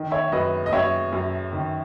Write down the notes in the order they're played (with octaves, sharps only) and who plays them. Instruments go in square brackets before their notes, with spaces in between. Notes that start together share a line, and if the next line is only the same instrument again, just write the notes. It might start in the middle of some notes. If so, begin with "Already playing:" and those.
Already playing: [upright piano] D#3
C#5 E5
E5
F#2 B4 D#5
D#5
F#2 C#5 E5
F#2
D#3